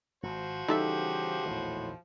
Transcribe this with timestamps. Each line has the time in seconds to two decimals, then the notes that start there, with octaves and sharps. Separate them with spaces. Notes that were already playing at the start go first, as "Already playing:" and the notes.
0.23 D#1 G#1 F3 F#4 C5
0.68 C#3 E3 G3 D#4 G4 A4 E5
1.46 A#1 E2 A2 D#3